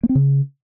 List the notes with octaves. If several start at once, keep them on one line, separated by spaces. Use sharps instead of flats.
A#3
C4
C#3